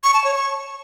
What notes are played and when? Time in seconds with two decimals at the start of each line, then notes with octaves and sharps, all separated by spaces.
0.04 C#6
0.14 A5
0.24 C#5
0.35 C#6